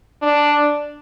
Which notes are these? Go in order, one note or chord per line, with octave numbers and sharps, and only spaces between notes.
D4